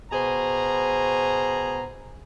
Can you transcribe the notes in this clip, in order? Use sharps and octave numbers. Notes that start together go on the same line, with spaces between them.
B2 G#4 C5 A#5